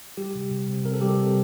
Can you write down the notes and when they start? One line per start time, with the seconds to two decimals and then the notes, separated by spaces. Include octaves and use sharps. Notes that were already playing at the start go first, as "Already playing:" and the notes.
0.17 G3 G4
0.35 C3
0.51 C3
0.68 C3
0.85 C3 A#4
0.93 A4
1.01 G3 G4
1.09 A4
1.19 C3